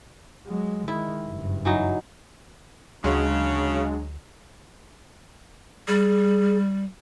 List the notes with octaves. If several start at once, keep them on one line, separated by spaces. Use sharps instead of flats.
F#3 G#3
D#3 G#3 E4
F#1 G2
E3 F#3 D#4
D2 C#3 F#3 G#3 D4
G3 G#4